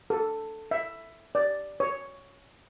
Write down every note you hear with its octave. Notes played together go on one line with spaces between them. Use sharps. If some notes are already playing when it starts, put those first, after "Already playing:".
A4
E5
D5
C#5